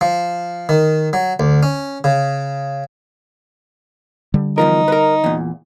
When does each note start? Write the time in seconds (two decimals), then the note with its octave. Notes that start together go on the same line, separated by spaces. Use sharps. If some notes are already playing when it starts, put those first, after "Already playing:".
0.01 F3
0.69 D#3
1.13 F#3
1.40 D2
1.63 C#4
2.04 C#3
4.34 D3 G3
4.58 E2 F3 D#4 A#4
4.88 A#4 B4
5.24 E2 A#2